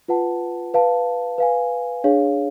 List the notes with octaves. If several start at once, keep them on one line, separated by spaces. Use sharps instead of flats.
F4 B4 F#5 A5
B4 F5 A5
B4 F5 G#5
D4 G#4 C#5 F5